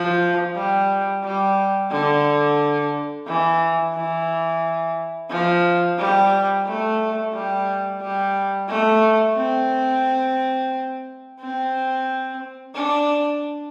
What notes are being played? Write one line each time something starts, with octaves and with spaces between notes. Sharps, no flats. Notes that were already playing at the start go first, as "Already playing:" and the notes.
Already playing: F3
G3
G3
D3
E3
E3
F3
G3
A3
G3
G3
A3
C4
C4
D4